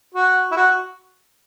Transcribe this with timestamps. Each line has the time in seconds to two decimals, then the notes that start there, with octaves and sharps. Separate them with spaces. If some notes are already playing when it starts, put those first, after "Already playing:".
0.15 F#4
0.51 E4
0.57 F#4